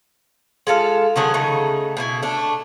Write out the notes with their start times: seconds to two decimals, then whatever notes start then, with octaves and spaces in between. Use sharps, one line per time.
0.67 G#3 F4 A4 F5
1.16 D3 D#3 F#3 G#4
1.34 C#3 A3 D#4
1.97 B2 E4 G#5
2.23 A3 D4